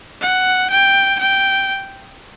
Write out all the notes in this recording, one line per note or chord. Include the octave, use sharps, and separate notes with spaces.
F#5
G5
G5